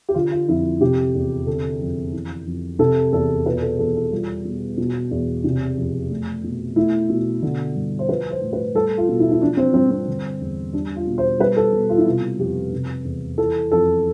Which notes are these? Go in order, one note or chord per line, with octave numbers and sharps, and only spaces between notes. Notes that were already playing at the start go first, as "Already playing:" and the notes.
G4
D3 F4
F4
F2 E4
C3 G4
E2
D3 A4
F2
E3
F2
C3 A4
E2 A4
B2 B4
A4
E2 A4
A4
G3 F4
B2
B2
E2
C3
F2
A3
B2
A3 E4
B2
D3
G2
C5
F3 B4
C5
A2
B4
G3 A4
F4
B2
E4
E4
F3 D4
C4
G2 C4
C4
D3
E2
G3 D4
F4
B2
C5
G3 B4
A4
B2
F4
E4
C3 F4
F2 G4
C3
E2
E3 A4
F2 A4